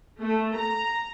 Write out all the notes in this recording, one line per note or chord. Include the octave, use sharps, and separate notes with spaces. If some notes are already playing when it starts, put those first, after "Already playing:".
A3
A#5